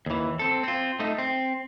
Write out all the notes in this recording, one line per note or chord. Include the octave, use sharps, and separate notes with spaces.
D#2 E3
C4 A4
C4 F4
A3 D#4
C4